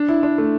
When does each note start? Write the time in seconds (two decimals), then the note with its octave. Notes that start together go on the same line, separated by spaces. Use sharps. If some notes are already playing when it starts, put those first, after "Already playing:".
Already playing: D4
0.08 E4
0.23 D4
0.38 A3